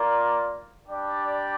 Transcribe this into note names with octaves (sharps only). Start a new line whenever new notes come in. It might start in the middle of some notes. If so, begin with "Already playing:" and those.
Already playing: A#3 F4 A#4 D5
G3 D4 G4 D5